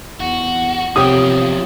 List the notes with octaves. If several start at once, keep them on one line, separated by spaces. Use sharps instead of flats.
E2 F#4
E2 C3 F3 G4 C#5 G5 D#6